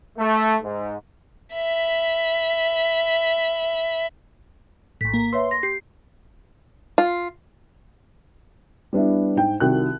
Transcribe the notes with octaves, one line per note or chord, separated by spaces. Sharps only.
A3
G#2
E5 B5
A#1 A2 B6
A#3
B4 C#5 E5 C6
A#6
G4 C7
F4
G3 B3 D4 E4
G#2 G5
C2 D#3 F#4 G5 F#6